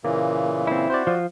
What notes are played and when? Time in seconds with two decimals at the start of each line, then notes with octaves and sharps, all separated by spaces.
0.04 A#2 C#3 E3 A#3
0.67 C4 E4
0.90 F#4 C5 D5
1.07 F3 F4